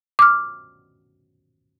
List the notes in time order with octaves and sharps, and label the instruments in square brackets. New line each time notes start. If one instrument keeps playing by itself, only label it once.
[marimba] D6 F6